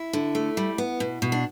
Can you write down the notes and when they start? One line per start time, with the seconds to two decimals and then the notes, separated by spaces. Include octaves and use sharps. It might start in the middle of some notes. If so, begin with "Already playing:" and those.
Already playing: E4
0.13 D3
0.35 A3
0.57 G3
0.78 B3
1.00 B2
1.22 B2
1.32 D4